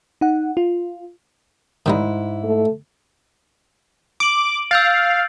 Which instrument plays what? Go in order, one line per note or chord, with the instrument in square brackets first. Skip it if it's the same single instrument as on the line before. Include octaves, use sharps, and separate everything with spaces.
[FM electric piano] D#4 F#5
F4
[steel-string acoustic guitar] G#2 E4 [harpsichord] D#3 G3 D#4
[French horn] A3
[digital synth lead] D6 [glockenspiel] D7 F#7
[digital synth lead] F5 [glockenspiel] E6 G6 A6